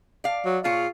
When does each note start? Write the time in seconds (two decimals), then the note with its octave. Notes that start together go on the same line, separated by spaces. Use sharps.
0.24 D5 F5
0.45 F#3
0.64 A#2 F4 G#4 C#5